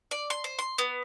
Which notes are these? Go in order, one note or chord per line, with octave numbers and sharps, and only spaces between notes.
D5
C6
C5
C6
B3